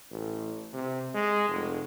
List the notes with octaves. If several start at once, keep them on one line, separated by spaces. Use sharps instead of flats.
A1
C3
G#3
F1